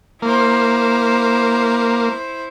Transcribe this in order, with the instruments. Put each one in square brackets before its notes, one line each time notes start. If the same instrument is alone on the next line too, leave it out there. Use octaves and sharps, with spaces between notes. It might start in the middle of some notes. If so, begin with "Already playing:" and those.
[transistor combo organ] A#3 [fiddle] E4 C5